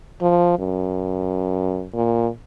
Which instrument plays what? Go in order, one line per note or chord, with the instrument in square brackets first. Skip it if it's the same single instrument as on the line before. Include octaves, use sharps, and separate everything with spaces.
[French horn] F3
F#2
A#2